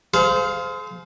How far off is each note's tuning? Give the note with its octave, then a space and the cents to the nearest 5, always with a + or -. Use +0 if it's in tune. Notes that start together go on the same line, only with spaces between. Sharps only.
G#4 +40 C5 -20 F5 +0